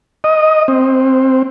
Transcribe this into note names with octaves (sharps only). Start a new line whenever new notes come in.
D#5
C4